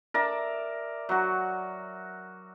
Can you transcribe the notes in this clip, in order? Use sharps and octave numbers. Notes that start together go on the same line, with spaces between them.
A#4 D5 E5
F#3 F#4